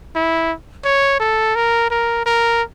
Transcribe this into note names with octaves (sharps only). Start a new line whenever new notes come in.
E4
C#5
A4
A#4
A#4
A#4